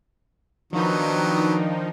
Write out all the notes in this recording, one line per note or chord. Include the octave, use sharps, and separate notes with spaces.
D#3 F3 F#3 B3 D4 D#4